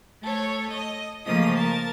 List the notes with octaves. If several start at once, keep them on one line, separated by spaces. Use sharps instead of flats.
A3 A4 C#5
D#5
C#3 F3 A3 A#3 D#5 D#6
A#4 A5